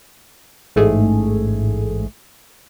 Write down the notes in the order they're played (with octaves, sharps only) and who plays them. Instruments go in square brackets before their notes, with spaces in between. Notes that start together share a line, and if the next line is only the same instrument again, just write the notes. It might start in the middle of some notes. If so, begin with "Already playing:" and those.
[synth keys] A1 G#2 A3 G#4